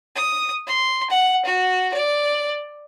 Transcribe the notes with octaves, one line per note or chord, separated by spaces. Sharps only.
D#6
C6
F#5
F#4
D5